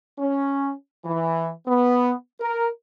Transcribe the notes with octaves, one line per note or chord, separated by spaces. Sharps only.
C#4
E3
B3
A#4